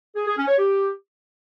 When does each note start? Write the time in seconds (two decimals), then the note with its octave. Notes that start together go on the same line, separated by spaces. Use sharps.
0.16 G#4
0.26 G#4
0.37 C#4
0.48 C#5
0.58 G4